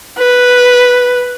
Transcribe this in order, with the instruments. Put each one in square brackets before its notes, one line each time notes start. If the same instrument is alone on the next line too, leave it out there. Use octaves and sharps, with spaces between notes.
[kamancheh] B4